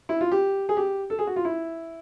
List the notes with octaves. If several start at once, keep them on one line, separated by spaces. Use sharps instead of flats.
E4
F4
G4
G#4
G4
A4
G#4
F#4
F4
E4